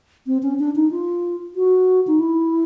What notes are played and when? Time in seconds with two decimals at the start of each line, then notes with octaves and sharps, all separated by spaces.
0.27 C4
0.43 C#4
0.59 D4
0.76 D#4
0.91 F4
1.56 F#4
2.07 D#4
2.20 E4